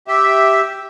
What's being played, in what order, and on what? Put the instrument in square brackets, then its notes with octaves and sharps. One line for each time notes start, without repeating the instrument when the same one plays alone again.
[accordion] G4 E5